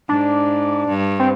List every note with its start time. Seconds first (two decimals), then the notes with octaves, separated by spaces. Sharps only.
0.09 G#2 D4
0.88 G2
1.19 C4